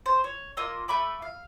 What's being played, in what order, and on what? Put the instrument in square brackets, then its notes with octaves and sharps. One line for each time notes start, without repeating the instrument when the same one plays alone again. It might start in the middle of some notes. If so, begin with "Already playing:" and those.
[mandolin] C5
C#5
A#3 F4 D#5 E6
A3 E5 B5 D6
F5